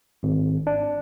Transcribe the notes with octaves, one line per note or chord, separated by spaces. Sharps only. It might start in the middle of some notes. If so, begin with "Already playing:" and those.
G#1
D4